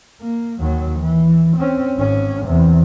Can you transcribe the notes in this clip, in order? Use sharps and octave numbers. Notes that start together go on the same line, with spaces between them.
A#3
D#2 F#3
E3
C4 C#4
G#1 C#4
E2 C3